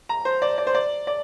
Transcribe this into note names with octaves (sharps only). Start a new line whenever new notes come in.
A#5
C5
D5
D5
C5
D5
D5